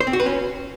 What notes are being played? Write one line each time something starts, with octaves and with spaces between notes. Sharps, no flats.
C5
C4
F#4
B4
C#4